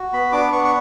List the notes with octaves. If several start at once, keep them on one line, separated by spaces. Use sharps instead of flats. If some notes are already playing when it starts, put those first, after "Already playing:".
Already playing: F#4
B3 B5
D4 D6
B3 C#6
C#6